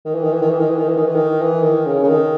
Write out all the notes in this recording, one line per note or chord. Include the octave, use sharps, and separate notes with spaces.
D#3
E3
D#3
E3
D#3
E3
D#3
E3
D#3
E3
D#3
E3
D#3
E3
D#3
C#3
C#3
D#3